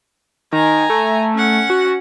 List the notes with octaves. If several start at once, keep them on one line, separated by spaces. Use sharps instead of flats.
D#3 G#5 A#5
A3
C#4 F#5
F#4